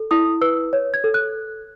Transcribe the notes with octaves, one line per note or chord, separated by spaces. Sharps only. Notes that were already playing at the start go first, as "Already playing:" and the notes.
Already playing: A4
E4 D#6
B4 E6
C#5
G#6
A4
F#6